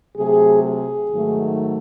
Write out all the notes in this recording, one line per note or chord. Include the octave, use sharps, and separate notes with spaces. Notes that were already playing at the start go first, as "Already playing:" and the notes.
C3 F#3 A3 G#4
G#4
G#2 D#3 F#3 A3